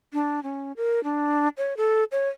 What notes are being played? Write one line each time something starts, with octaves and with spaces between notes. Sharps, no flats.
D4
C#4
A#4
D4
C#5
A4
C#5